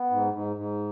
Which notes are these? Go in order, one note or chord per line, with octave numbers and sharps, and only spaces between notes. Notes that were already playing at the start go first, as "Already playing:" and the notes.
Already playing: B3
G#2
G#2
G#2